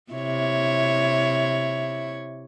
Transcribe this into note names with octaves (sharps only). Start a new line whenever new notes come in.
C3 E4 C#5